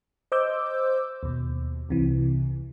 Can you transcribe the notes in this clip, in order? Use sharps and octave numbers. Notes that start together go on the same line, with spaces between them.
C5 D#5 D6 E6 G6
D#2 B2
C2 C3 E3